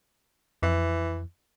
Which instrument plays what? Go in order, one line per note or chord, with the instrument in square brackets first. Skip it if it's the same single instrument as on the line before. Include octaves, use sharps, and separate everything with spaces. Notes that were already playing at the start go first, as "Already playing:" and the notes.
[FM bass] F2 [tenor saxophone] E3